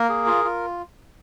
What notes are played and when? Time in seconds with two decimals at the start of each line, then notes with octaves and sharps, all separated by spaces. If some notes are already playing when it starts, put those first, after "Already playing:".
Already playing: A#3 A#4
0.09 G#4
0.27 F4
0.44 F4